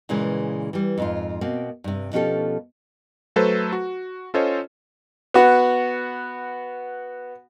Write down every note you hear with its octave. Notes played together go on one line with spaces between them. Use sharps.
A#2 C#3 E3 G#3
E3 G3
F2 G#2 F4
B2 A#3 C4
G2 C3
B2 F3 C#4 G4 A4
F#3 A3 A4 B4 C5
F#4
C#4 F4 A4 C5 C#5 D#5
B3 F#4